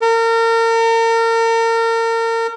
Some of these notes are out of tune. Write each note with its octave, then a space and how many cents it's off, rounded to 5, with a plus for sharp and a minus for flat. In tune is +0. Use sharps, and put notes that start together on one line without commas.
A#4 -35